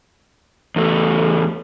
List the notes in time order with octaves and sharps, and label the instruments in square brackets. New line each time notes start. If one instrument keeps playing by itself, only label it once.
[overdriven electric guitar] E2 A3